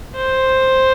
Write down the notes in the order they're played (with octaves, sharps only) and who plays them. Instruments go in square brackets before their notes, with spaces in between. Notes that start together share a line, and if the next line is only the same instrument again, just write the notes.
[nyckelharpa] C5